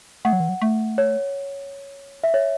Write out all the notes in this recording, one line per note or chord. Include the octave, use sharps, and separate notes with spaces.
A3 F#5
F#3
E3
F#3
A3
C#5
E5
C#5